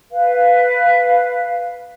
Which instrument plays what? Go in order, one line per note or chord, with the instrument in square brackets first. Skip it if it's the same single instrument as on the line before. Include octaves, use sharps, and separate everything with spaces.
[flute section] B4 F5